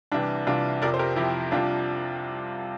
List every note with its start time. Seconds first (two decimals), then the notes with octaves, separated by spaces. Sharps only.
0.12 C2 C3 E3 D4
0.47 C2 C3 E3 D4 F4
0.82 F2 C3 F3 A#4 D5
0.94 C5
0.99 G4 A#4
1.16 F2 C3 F3 E4 G4
1.51 C2 C3 F3 D4 F4